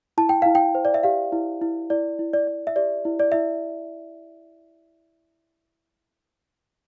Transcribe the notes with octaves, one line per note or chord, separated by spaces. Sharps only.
E4 A5
G5
E4 F5
G5
C5
D5
E5
G4 F5
E4
E4
E4 D5
E4
D5
D5
E5
G4 D5
E4
D5
E4 E5